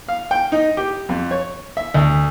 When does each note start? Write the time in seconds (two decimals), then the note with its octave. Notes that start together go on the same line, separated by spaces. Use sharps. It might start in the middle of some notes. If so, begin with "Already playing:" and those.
0.08 F5
0.31 G5
0.52 D#4
0.77 G4
1.09 F2
1.31 C#5
1.77 E5
1.94 D2